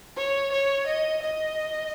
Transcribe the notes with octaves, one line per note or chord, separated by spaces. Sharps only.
C#5
C#5
D#5
D#5